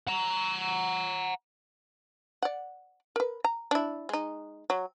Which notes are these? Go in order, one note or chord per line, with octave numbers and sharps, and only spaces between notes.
F#5 A#5
D5 F#5
A#4 B4
A#5
D4 E4
G#3 D#4
F#3